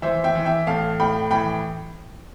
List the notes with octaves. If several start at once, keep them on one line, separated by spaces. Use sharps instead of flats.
E3 C5 E5
E5 G5
E3
E5 G5
A2 F5 A5
A2 G5 B5
E3 G5 B5